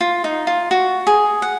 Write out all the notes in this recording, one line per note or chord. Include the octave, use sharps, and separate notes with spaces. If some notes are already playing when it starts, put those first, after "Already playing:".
F4
D#4
F4
F#4
G#4
F#5